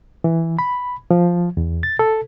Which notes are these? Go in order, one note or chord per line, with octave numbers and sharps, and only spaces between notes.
E3
B5
F3
E2
A6
A4